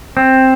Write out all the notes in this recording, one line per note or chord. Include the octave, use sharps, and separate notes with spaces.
C4